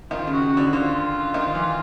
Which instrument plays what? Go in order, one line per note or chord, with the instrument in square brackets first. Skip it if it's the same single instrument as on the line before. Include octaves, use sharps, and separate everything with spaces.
[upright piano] D#3 [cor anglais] F4
[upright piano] C#3
[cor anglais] F#4
[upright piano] C#3
[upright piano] D3 [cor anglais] F#4
[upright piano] D3 [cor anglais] F4
[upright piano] D#3
E3